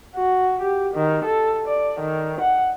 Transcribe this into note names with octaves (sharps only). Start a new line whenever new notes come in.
F#4
G4
D#3
A4
D5
D#3
F#5